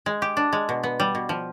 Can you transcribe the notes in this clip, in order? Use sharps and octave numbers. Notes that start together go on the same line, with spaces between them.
G#3
G4
D4
G#3
B2
B3
G3
B2
F3